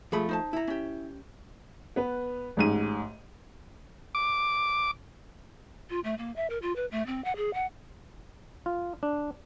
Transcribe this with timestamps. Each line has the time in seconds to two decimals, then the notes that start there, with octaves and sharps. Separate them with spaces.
0.12 F3 A3 F4 G#4 B5
0.29 D#4 C5 A5
0.53 E4 A#5
0.67 C#4 G4
1.96 B3 B4
2.57 A1 G#2 D#7
4.15 D6
5.90 F4
6.04 A3
6.18 A#3
6.36 E5
6.50 A#4
6.62 F4
6.76 B4
6.92 A3
7.06 C4
7.24 F#5
7.36 G#4
7.54 F#5
8.66 F4
9.03 D4